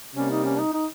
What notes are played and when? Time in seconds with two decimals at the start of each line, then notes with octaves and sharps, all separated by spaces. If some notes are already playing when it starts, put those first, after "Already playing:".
0.15 C3 G3 A#3 C#4
0.30 D#4
0.45 C#4
0.59 D#4
0.73 D#4